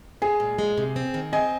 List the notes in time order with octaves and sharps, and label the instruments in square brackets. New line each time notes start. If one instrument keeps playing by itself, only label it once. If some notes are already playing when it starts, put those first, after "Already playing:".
[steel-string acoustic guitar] G#3 [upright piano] G#4
[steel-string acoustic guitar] A#2
G#3
C3
C4
D#3
[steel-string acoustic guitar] C4 [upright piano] D#5 G#5